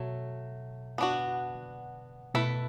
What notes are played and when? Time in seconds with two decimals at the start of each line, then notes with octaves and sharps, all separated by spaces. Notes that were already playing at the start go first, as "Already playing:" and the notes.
Already playing: B2 F#3 A3
0.98 B3 D4 F#4
2.34 B2 A3 E4 B4